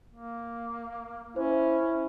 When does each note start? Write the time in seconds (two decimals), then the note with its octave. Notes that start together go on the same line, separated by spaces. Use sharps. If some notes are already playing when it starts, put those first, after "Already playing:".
0.13 A#3
1.36 C#4 E4 C5